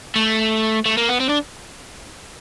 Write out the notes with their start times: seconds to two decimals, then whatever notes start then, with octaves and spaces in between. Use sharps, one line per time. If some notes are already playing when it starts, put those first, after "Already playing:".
0.16 A3
0.86 A3
0.97 A#3
1.09 B3
1.20 C4
1.29 D4